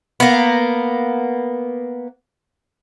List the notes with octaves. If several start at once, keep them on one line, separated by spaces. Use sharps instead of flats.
A#3 B3